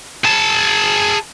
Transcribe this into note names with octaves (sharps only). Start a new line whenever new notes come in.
G#4 A5